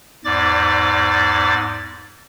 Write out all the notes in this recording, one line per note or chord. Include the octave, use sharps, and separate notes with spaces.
E2 G#2 D5 D6 A6